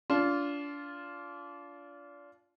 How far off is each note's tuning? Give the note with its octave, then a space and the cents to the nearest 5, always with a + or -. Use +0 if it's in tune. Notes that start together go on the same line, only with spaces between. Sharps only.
D4 -30 F4 -5